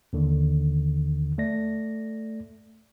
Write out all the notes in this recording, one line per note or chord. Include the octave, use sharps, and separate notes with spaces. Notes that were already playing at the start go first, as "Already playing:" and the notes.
D#2 D3 D#3
A3 D5 A#6